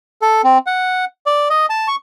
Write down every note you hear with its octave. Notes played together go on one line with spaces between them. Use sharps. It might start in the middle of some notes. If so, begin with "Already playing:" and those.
A4
C4
F#5
D5
D#5
A5
C#6